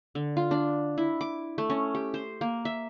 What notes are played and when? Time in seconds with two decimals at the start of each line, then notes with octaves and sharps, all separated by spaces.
0.15 D3
0.37 F4
0.51 D4
0.98 E4
1.21 D6
1.58 A3
1.70 C#4
1.95 G4
2.14 C5
2.41 A#3
2.65 E5